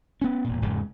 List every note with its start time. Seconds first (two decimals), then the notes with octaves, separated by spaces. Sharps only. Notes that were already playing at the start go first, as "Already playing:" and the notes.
0.21 B3 C#4
0.44 E1 A#2
0.61 E1 G#2 C#3